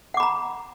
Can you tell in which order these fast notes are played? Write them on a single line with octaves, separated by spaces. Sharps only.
F#5 D6 B5 A#5